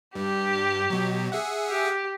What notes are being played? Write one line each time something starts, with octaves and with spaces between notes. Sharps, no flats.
G2 G4
B2 F#3
G#4 E5 F#5
G4